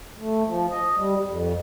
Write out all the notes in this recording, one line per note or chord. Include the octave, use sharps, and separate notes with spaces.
A3
F3
D#5
G3
F2